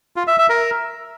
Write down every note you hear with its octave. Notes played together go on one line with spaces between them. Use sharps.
F4
E5
E5
A#4